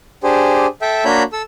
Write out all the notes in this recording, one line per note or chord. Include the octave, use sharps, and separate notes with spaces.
D4 G4 G#4 C5
A4 E5 G5
A#3 D4 F#4 C#5 B5 G6
A4 E6